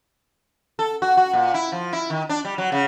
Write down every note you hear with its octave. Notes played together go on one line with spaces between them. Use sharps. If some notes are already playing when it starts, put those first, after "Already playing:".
A4
F#4
F#4
A#2
E4
F3
E4
D#3
D4
G3
F#3
C#3